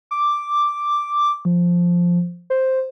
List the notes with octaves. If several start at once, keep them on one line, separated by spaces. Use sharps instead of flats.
D6
F3
C5